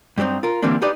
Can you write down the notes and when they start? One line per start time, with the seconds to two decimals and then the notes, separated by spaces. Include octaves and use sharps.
0.18 G2 F#3 A3 C4 D#4
0.43 F4 A#4
0.62 D3 E3 G3 A#3 C4 D4
0.82 D4 D#4 G4 B4 D5 D#5